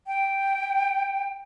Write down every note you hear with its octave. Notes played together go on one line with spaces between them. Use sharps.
G5